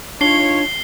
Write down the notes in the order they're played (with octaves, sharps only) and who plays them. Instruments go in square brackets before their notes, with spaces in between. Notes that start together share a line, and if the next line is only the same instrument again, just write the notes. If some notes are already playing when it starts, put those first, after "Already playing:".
[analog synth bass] D4 [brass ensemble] D#4 F4 C#5 [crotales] C7 G7